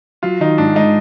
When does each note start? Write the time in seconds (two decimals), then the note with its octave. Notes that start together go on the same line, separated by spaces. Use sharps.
0.23 F#3 F4
0.40 D#3 D#4
0.58 G#2 D4
0.75 G#3 D#4